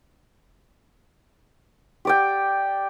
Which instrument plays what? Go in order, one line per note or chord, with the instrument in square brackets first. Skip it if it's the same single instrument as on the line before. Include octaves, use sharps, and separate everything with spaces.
[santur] G4 D5 G5